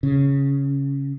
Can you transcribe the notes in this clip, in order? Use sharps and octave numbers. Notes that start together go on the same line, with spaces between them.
C#3